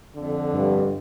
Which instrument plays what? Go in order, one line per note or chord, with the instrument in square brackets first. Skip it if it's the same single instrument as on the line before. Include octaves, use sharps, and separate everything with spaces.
[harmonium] F2 [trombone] D3
[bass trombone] G2